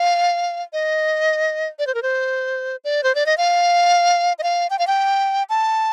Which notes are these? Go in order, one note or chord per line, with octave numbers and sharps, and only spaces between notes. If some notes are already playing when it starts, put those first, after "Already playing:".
Already playing: F5
D#5
D5
C5
A#4
C5
D5
C5
D5
D#5
F5
D#5
F5
G5
F5
G5
A5